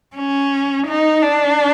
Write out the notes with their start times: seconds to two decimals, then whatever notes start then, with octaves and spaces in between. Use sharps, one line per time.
0.16 C#4
0.88 D#4
1.22 D4